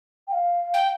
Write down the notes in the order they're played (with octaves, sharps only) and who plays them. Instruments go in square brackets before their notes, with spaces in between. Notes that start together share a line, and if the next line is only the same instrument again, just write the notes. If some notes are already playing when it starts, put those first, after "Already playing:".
[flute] G5
F5
[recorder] G5